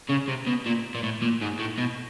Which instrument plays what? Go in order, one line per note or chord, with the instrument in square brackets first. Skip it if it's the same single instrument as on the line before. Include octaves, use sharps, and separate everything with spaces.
[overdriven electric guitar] C#3
C3
B2
A#2
A#2
A2
A#2
G#2
A2
B2